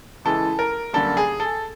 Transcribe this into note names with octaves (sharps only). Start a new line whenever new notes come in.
C#2 C#3 E3 G#3 A4
A#4
F#2 D3 G3 A#3 A4
G#4
A4